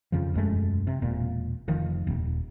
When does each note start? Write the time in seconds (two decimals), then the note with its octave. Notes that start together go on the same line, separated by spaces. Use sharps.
0.12 F2 C#3 F3
0.34 E1 F#2 G#3 A3
0.87 C3
1.02 E1 A#2
1.68 F1 D#3 F3
2.07 D#1